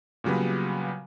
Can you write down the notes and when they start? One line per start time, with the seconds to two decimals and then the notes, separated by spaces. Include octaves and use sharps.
0.24 A#2 C#3 F#3 G3 B3